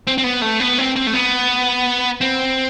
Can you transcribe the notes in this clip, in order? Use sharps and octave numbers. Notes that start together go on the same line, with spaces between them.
C4
C4
B3
A3
B3
C4
C4
A3
B3
C4